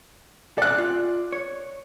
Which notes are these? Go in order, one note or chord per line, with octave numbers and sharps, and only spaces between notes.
A4 D5 F#6
F4
C#5